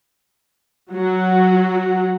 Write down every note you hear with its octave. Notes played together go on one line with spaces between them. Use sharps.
F#3 F#4